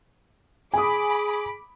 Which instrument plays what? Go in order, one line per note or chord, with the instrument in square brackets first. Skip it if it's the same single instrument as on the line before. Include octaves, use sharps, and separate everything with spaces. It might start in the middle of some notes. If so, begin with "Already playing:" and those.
[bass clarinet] G#4 [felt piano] G#5 D#6 [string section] B5 D6